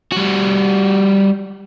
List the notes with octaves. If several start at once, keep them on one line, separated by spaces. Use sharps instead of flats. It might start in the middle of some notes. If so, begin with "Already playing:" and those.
G3 F#4